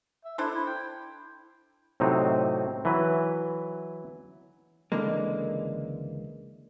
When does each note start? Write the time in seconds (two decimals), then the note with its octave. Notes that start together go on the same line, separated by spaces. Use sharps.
0.25 E5
0.38 D4 E4 A4 C5
0.54 E4
0.66 G5
2.00 A2 C3 F#3 C4 D#4
2.85 E3 F#3 B4
4.92 C#2 D3 E3 G#3 A#3